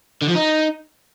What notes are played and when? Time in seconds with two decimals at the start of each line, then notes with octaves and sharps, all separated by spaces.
0.22 D3
0.29 F3
0.36 D#4